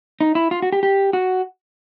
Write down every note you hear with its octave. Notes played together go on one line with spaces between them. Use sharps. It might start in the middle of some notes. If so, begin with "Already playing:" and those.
D#4
E4
F4
F#4
G4
G4
F#4